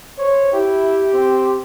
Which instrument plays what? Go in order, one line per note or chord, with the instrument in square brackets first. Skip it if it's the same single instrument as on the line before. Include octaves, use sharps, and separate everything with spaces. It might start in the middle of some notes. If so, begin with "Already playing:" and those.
[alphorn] C5 [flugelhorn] C#5
[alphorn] E4 [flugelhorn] G4
[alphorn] C4